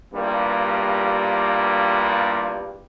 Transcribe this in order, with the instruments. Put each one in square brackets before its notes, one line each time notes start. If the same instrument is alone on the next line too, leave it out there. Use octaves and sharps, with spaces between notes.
[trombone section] E2 G2 G3 A#3 F4